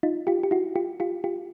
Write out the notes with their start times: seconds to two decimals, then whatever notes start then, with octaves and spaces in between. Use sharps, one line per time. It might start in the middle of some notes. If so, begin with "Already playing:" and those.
0.03 D#4 F4
0.27 F4 G4
0.43 G4
0.51 E4 F#4
0.76 F4 G4
1.00 F4 G4
1.24 F4 G4